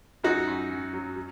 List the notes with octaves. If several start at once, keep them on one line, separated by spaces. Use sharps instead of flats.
F#2 D#4 F#4
F#2
F#2
F#3
F#3